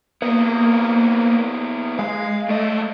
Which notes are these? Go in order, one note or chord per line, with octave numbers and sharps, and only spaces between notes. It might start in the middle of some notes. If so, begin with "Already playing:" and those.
F3 A#3 B3
G#3 F5
F#2 A3 D#5